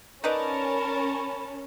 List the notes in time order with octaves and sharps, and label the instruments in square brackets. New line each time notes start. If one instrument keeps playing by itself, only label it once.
[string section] C#4 [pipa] D#4 B4 D5 [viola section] A#4 A5 [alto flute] B5